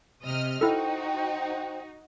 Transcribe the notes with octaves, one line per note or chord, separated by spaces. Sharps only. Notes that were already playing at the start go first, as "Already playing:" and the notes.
C3 D#5 F6
D#4 E4 F#4 A4 C5 G5